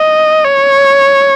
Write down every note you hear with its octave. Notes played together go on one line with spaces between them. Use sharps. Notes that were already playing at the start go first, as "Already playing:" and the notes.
Already playing: D#5
C#5